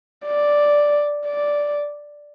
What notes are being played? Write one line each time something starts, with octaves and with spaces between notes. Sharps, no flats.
D5
D5